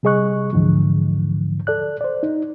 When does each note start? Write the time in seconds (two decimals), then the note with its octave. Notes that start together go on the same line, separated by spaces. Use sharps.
0.03 C3 G3 G#4 D#5 C#6 F#6
0.53 D2 G#2 D3 E3 F3
1.67 A4 D5 F#6
2.01 C5 D5
2.23 D#4